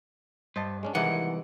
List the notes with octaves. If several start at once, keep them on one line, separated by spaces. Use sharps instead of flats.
G2 C5 D#5 A5
G#3 C#4 D4
C2 D#3 E3 G#3 D#4 F#5